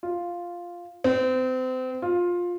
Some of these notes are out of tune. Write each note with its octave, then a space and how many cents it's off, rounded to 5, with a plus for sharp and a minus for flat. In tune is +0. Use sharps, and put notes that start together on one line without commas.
F4 +0
C4 -30
F4 +15